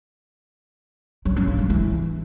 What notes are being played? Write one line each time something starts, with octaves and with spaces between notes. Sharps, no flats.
F#3
C#4
A#3
G#3
E3